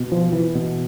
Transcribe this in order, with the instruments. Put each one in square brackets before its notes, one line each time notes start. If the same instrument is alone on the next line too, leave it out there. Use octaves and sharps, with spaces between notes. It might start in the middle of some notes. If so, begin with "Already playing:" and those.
Already playing: [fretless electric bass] B2
F3
E3
B2